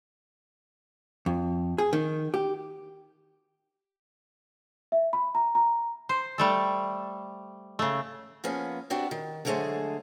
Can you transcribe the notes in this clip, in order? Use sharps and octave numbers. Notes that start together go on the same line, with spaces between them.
F2
G#4
D#3
G4
E5
B5
A#5
A#5
C5
G3 A3 A4
C#3 A3
F3 A#3 B3 C#4 G#4
B3 C4 D4 F#4 G4
D#3
D3 F#3 G#3 A3 G#4 C5